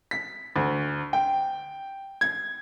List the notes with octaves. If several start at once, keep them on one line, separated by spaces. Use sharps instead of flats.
B6
D2
G5
G#6